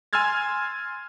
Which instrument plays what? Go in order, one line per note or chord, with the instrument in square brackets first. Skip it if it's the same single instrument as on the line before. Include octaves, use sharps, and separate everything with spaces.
[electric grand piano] G#5 C6 E6 F6 G#6 A6